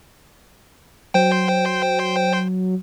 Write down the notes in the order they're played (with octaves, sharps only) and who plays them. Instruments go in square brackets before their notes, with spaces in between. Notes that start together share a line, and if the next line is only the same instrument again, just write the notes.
[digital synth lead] F#3 [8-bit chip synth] C5 G5